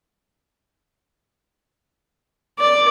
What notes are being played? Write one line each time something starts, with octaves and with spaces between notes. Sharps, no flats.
D5